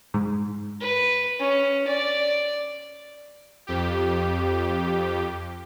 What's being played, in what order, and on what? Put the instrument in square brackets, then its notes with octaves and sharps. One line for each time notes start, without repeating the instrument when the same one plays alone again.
[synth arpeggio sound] G#2
[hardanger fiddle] B4
C#4
D5
[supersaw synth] F2 G4